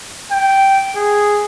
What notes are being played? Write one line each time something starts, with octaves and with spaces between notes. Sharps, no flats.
G5
G#4